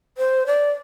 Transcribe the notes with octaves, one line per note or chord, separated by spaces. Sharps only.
C5
D5